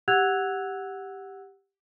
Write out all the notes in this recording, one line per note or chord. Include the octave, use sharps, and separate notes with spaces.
G4 F#5 E6 F#6 G#6 F7